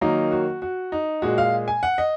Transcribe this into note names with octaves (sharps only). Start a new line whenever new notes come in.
D#3 F#3 A#3 D#4
F#4
F#4
D#4
A#2 G#3 F#4
F5
G#5
F#5
D#5